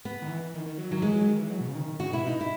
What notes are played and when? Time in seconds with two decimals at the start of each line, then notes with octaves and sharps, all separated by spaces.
0.05 B3
0.22 D#3
0.29 E3
0.54 D#3
0.66 D#3
0.78 F#3
0.91 D#3 F#3
1.02 E3 G#3
1.15 F#3
1.28 D#3
1.39 E3
1.51 F#3
1.61 B2
1.68 C#3
1.75 D#3
2.00 C#3 F#4
2.12 B2 E4
2.24 B2 D#4
2.41 E4